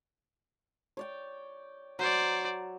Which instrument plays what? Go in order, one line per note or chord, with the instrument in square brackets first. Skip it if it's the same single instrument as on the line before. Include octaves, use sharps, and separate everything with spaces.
[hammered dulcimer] C#5 D5 G5
[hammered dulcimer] F#3 [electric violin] C5 D5